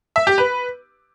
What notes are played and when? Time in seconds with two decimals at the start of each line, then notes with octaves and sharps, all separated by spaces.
0.16 E5
0.27 G4
0.38 B4